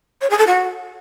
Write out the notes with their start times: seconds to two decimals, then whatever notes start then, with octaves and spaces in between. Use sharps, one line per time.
0.21 C#5
0.30 G#4
0.38 A4
0.47 F#4